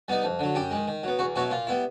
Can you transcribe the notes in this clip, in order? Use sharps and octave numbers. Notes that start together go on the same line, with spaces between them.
G3 B3 D#4
F2
D3 F#3
F#2 G4
D#3 G#3
D#3
F#3 B3
E2 F#4
B2 F#3 B3 E4 F#4
A#2 F4
G3 B3 E4